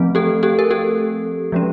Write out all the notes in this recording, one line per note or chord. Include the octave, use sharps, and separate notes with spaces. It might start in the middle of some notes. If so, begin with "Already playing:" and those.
Already playing: F3 A3 C4
G4 A4
G4 A4
A#4
G4 A4
F3 G#3 C#4